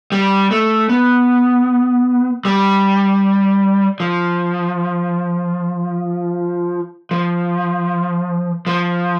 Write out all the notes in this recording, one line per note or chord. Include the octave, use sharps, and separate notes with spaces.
G3
A3
B3
G3
F3
F3
F3